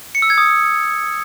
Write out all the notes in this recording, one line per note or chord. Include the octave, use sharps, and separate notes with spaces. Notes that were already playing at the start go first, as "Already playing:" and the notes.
C#7
E6
G#6
D#6